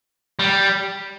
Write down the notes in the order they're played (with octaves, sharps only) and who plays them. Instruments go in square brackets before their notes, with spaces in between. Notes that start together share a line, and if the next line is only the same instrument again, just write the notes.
[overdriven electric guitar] G3